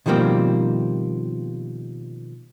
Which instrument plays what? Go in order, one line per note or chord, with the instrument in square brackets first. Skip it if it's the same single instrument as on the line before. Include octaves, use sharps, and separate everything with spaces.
[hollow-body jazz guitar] B2 D#3 F3 G3 A#3 C4